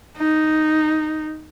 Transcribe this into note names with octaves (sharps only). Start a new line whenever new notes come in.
D#4